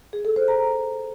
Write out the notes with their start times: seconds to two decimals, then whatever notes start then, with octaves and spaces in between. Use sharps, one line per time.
0.13 G#4
0.25 A4
0.36 C5
0.48 A#5